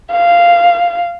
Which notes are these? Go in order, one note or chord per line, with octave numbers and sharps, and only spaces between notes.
F5